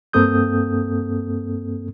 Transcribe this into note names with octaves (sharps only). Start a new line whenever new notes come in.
G2 A#3 C4 A4 D#6 G6